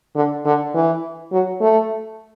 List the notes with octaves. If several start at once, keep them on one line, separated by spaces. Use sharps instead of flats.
D3
D3
E3
F#3
A3